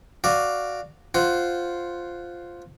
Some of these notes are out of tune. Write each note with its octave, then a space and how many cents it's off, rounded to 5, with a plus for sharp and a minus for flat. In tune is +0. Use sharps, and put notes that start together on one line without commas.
F#4 +0 D5 +0 F5 +0
F4 +0 C5 +0 F#5 +10